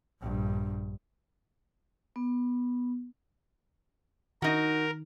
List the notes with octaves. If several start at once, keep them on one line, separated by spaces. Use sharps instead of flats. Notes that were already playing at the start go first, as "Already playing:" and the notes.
A#1 G2
B3
D#3 D#4 F#4 A#4